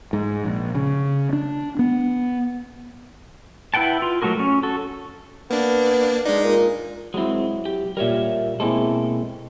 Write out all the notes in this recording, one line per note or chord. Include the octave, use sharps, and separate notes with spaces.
G#2
A#1
C#3
D4
B3
E4 B4 F#5 G5 A5
F4
F#3 A3 F#4 G#4 A#4
C#4
F#4 A4
A#3 B3 D4
G#3 D4 D#4
A#2
F#3 G#3 C4 E4
G4
A#2 G3 A#4 C#5 E5
B2 G#3 A#3 C4 E4 A4